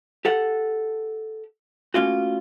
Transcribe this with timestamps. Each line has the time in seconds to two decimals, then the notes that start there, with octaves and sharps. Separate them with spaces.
0.25 G4 A4 F#5
1.94 A3 A#3 C#4 F4 F#4